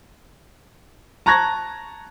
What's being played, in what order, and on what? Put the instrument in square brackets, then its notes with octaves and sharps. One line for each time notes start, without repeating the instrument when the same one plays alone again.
[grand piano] A5 A#5 C#6 F#6 G#6 A#6